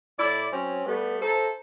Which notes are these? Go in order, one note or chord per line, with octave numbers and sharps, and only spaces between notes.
A2 E4 D5
F#3 C4 C#4
G3 A3 B3
E4 A4 C5 A#5